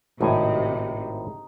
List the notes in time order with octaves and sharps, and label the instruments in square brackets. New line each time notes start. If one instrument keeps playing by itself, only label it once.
[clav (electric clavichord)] G#1 A2 G#5 [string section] C3 [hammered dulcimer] D#4